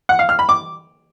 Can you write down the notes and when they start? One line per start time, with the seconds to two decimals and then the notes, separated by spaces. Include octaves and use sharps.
0.09 F#5
0.19 F5
0.29 F6
0.39 B5
0.49 D6